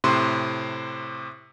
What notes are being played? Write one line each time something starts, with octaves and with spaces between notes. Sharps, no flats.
A2 C3 C6